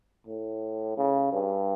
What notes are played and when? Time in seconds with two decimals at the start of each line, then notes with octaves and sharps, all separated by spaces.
0.27 A2
0.98 C#3
1.33 G2